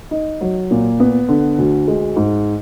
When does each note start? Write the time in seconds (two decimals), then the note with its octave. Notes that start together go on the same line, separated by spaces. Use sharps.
0.11 D#4
0.41 F#3
0.71 A#2
1.00 B3
1.28 D3
1.58 D2
1.88 G#3
2.16 G#2